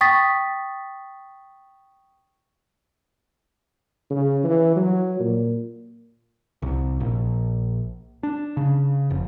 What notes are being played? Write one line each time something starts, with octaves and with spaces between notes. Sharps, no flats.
G5 C#6 D#6 A6 B6
C#3
E3
F#3
A#2
C2
A#1
D4
C#3
F1